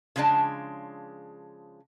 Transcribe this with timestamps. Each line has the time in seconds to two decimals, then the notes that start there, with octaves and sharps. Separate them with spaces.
0.16 C#3 F3 G#3 D4 A5